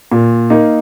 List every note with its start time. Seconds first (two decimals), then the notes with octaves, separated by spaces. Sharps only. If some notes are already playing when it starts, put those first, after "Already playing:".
0.12 A#2
0.50 A#3 D#4